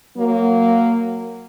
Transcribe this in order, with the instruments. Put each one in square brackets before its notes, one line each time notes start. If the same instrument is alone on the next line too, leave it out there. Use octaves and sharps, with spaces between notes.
[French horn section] F#3 A#3